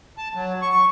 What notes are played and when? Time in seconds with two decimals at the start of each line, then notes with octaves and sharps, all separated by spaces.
0.18 A5
0.35 F#3
0.62 C#6